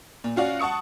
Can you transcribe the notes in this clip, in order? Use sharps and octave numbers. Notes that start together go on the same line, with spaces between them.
A#2
C#4 F4 F#4 D5
F#5 A5 C#6 D#6 C#7